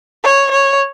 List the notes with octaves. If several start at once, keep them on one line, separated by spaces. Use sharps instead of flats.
C#5
C#5